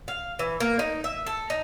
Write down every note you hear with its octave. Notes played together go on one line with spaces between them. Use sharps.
F5
E3
A#3
D#4
E5
A4
D#4